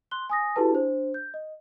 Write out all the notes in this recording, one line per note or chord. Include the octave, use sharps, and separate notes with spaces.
C6 F#6 G7
G#5 D#6 A#6
E4 F#4 G4 A4 B4 A5
D4 C5
G6
D#5